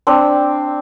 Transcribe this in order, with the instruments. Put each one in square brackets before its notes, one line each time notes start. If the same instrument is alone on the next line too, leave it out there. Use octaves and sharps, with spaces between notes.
[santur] C4 D4